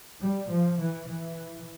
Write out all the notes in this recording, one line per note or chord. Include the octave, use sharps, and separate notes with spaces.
G3
F3
E3
E3